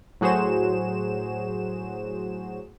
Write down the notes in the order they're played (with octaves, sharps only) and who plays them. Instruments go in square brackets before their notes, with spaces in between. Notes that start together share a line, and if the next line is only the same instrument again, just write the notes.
[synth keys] A2 F#3 F#4 G#4 C5 E7